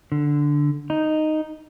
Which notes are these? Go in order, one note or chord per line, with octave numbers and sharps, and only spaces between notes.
D3
D#4